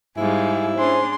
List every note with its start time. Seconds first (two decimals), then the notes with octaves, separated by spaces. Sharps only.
0.17 G#2 G3 E4 G#4 F5
0.77 C#4 D4 G#4 C5 C6